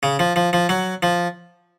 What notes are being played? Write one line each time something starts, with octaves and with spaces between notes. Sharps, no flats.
C#3
F3
F3
F3
F#3
F3